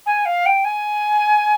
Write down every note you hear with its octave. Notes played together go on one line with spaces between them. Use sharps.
G#5
F5
G5
G#5